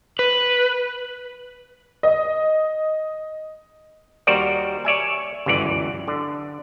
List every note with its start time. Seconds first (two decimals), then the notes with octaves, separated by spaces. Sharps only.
0.19 B4
2.03 D#5
4.27 D#2 G3 F#4 A#4 C5 D5
4.85 C#5 D5 E5 G#5
5.46 G1 C#2 F#2 E3 D5
6.08 D3